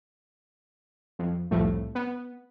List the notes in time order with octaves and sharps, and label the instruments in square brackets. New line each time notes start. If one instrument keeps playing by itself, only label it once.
[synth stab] F2
C2 F2 A2 A3
B3